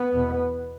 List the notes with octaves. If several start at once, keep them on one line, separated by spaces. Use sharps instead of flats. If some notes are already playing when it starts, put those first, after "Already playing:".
Already playing: B3
E2 B2